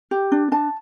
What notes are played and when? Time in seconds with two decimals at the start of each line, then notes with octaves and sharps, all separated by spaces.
0.11 G4
0.32 D4
0.52 D4 A5